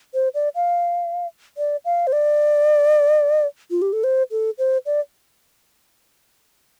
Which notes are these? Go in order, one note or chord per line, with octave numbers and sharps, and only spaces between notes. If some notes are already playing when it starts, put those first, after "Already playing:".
C5
D5
F5
D5
F5
C5
D5
F4
G4
A4
C5
A4
C5
D5